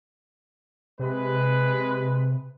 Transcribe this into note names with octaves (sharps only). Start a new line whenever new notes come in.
C3 G#3 B4